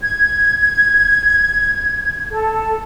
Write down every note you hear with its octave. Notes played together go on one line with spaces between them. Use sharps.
G#6
A4